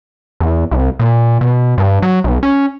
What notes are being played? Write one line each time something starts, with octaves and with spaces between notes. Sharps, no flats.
E2
C2
A#2
B2
G2
F#3
B1
C#4